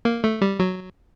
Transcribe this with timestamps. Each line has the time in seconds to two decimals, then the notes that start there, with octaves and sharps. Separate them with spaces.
0.05 A#3
0.24 A3
0.42 G3
0.59 F#3